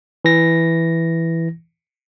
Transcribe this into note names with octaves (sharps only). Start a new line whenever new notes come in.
E3 A#6